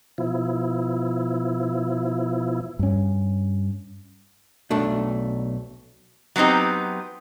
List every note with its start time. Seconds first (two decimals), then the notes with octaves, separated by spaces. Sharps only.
0.18 B2 F3 E4
2.79 G2 C#4
4.70 B1 A3 D4
6.36 F#3 B3 C4 D#4 G4